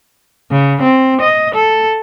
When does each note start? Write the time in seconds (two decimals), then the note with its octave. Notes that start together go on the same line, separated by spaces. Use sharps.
0.51 C#3
0.82 C4
1.21 D#5
1.55 A4